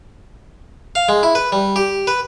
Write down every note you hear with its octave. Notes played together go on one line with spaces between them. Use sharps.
F5
G#3
E4
B4
G3
G4
B4